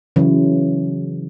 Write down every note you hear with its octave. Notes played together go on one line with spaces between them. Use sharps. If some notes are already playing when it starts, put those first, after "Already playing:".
C#3 E3 F#3